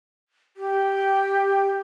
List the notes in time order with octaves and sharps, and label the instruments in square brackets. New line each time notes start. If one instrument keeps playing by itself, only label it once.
[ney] G4